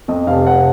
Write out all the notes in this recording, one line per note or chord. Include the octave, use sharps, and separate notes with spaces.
F2 D#5
F1 F5
F1 F#5